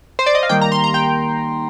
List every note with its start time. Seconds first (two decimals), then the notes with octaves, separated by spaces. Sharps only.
0.19 C5
0.26 D5
0.35 D#5
0.43 F5
0.49 D#3 G3 A#3 G5
0.61 A#5
0.72 C6
0.84 A#5
0.94 G5